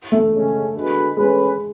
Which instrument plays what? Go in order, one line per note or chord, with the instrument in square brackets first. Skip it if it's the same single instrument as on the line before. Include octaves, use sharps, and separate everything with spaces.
[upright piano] A3
[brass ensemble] C#3 G#3 C#4
D3 G#3 B3 F#4 B4
[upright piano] G#3 [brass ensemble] A3 C#4 G#4 B4